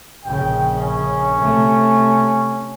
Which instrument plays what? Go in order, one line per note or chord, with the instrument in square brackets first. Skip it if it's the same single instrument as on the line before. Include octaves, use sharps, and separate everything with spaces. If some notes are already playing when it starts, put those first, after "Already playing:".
[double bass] A#1 C#3 [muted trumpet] G5
[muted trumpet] C#4
[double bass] C3 A3